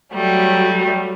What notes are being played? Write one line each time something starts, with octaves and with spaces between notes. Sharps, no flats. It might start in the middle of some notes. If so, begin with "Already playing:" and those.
F#3 G3 A3